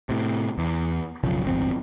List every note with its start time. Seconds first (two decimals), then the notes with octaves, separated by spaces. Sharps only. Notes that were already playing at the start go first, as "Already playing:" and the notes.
0.09 A2 C3
0.58 E2
1.23 B1 F#2 C#3 F3
1.44 D1 G1 E2 C4